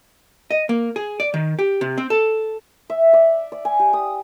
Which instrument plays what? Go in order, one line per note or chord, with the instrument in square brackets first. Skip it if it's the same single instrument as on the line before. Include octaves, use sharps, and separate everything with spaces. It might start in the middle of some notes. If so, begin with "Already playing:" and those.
[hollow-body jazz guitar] D#5
A#3
G#4
D5
D#3
G4
C3
C4
A4
[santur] E5
D5
D5
G#5
G4
D#6